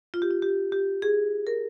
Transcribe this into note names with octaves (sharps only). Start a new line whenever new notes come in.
F4
G4
F4
G4
G4
G#4
A#4